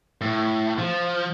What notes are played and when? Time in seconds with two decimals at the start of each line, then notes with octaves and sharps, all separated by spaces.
0.21 A2
0.79 F3